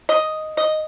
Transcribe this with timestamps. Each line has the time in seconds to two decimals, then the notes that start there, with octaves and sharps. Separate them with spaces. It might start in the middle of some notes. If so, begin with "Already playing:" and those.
0.09 D#5
0.57 D#5